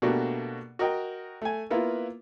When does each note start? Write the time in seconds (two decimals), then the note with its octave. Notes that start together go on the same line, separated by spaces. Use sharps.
0.02 B2 A3 A#3 D4 F#4 G4
0.79 F#4 A#4 D#5 G5
1.42 A3 G#5
1.70 A#3 B3 E4 F4 B4